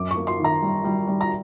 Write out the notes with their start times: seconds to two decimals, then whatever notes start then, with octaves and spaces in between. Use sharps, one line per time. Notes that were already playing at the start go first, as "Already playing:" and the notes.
Already playing: F#2 D6
0.11 C#6
0.17 A#3
0.27 C6
0.40 D#3 A#5
0.62 G3
0.84 G3
1.07 G3
1.21 A#5